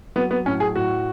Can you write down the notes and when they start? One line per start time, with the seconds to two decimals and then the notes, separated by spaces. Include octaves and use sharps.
0.16 F#3 B3
0.31 B3
0.46 A2 C#4
0.60 G#4
0.75 A2 F#4